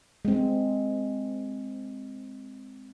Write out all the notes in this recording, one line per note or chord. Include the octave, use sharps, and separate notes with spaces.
G#3 C4